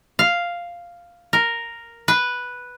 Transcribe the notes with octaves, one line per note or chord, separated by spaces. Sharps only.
F5
A#4
B4